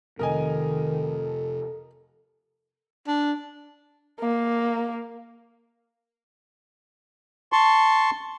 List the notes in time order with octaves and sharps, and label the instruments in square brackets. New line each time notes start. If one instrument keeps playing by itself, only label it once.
[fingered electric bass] F2 C3 [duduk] D#3 [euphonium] A4 [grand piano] A#4 D#5 G#5
[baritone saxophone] D4
[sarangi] A#3
[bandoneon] A5 C6 C#6